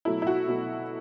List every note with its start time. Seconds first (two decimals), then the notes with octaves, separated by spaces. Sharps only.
0.05 B2 F#3 A3 E4
0.22 E4
0.27 F#4
0.48 B2 F#3 A3